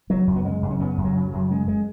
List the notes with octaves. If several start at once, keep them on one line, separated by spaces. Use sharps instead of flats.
C#3 F#3
F#2
B3
C#3 G#3
F#2
C#4
C#3 B3
F#2
F#3
C#3
F#3
F#2
C#3 G#3
G#3